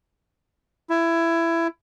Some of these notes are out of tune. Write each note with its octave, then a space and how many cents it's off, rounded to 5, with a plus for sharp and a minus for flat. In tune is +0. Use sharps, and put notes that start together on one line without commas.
E4 +15